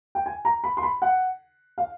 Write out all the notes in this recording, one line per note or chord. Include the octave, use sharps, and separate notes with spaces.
G5
G#5
A#5
B5
C6
B5
F#5
F5